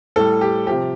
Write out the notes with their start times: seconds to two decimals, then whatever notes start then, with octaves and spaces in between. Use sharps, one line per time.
0.16 A2 G3 A4
0.41 G4
0.67 C3 F3 G4